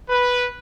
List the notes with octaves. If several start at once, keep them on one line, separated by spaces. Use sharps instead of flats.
B4